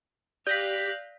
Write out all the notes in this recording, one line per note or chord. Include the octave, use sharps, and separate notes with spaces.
G4 D5 F5 F#6 G6 A#6 B6